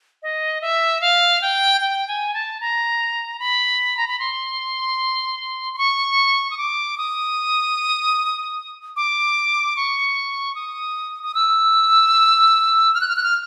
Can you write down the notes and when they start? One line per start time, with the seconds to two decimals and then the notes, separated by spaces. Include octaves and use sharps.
0.22 D#5
0.61 E5
1.01 F5
1.42 G5
1.81 G5
2.08 G#5
2.34 A5
2.60 A#5
3.39 B5
3.97 A#5
4.08 B5
4.19 C6
5.73 C6
5.78 C#6
6.50 D#6
6.57 D6
6.98 D#6
8.96 D6
9.76 C#6
10.55 D#6
11.23 D#6
11.34 E6
12.94 F6
13.01 F#6
13.08 F6
13.16 F#6
13.23 F6